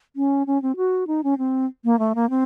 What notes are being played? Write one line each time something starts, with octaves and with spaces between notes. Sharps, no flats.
C#4
C#4
C4
F#4
D#4
C#4
C4
A#3
A3
A#3
C4